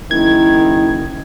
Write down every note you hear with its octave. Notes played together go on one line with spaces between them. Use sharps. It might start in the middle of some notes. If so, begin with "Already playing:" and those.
F#1 D#3 E4 G#6